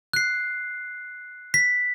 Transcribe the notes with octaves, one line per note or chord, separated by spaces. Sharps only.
F#6 C7
B6